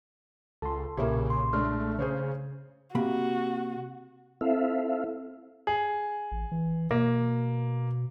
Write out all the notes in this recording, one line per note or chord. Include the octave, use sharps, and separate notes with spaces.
C#2 A4 A5 C6
B1 A#2 C#3 A#3 C#4 E4 G4
C6
G#3 A3 D4 F6
C#3 G#4 C5 C#5
C3 A#3 F#4 B5
C4 E4 A4 E5 F5
G#4
A1
E3
B2 A#3